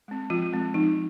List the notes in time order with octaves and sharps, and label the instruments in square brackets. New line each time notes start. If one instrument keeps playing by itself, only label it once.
[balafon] G#3 C4
F3 F4
G#3 C4
F3 D#4